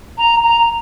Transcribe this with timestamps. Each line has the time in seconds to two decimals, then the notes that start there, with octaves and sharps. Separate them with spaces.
0.18 A#5
0.43 A#5